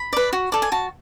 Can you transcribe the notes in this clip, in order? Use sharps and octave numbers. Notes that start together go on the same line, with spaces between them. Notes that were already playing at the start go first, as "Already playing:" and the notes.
Already playing: B5
B4 D5
F#4
A4 D5
G#5
F#4 A5